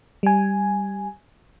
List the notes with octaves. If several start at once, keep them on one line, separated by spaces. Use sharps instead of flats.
G3 G#5